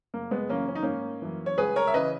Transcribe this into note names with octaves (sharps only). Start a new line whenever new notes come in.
F#1 A#3
G#3 B3
F#2 C#3 E3 A#3 C#4
C#4
D#4
G#1 A#3 C#4
F#2 E3
C#5
C#2 G#4 B4
A#4 C#5
E5
C#3 E3 B4 D#5